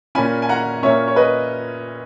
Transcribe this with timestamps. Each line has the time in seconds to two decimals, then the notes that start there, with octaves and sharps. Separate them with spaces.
0.15 A#2 A#3 C#4 G#5 B5
0.42 G#5
0.49 F#5 A#5
0.83 A#2 A#3 C#4 C#5 E5
1.08 C#5
1.16 B4 D#5